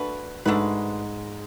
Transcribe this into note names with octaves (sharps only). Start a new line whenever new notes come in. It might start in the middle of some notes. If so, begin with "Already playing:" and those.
Already playing: A3 D4 F#4 B4
G#2 G#3 A3 D4 F#4 B4